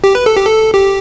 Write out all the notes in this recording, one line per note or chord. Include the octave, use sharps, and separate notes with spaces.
G4
B4
A4
G4
A4
G4